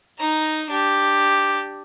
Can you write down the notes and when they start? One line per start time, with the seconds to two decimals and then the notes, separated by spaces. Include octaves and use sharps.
0.19 D#4 A#5
0.71 D4 G4